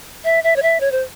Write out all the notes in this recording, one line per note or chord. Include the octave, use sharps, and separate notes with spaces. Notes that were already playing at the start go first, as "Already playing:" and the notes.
E5
E5
C#5
E5
C#5
C5